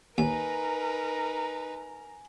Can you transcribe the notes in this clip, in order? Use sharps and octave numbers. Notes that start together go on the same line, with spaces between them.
D#2 D#4 A#4 B4 G#5 A#5